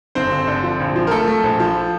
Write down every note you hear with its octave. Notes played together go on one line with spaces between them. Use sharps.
G1 C4 C5
G1
D3
F3
A#1
F3
A#4
A3 A4
A3
A#1
F3